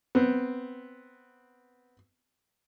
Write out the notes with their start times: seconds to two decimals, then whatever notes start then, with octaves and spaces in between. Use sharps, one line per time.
0.15 B3 C4